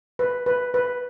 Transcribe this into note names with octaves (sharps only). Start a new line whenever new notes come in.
B4
B4
B4